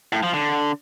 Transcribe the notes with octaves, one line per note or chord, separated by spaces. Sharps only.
A2
F3
D3